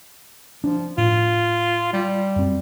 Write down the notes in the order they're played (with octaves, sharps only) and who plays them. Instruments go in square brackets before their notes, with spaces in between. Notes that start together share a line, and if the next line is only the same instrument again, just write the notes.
[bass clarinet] F3 [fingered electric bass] D4
[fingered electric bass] A2 [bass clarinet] F4
[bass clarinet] G3
[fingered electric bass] F#2 C4